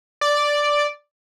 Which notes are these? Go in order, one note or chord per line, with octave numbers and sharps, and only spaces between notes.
D5